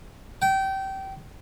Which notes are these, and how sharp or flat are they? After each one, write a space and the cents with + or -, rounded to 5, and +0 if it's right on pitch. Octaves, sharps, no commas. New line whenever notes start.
G5 -25